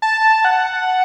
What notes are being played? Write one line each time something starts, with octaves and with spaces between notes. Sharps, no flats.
A5
F#5